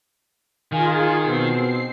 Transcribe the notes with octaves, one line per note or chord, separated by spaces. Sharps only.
D#3 F4 G#4 G#5
B2 C4 C7